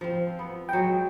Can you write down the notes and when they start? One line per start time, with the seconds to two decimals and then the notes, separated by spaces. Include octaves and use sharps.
0.01 F3 C4
0.39 B3
0.69 F#3 G#3 G5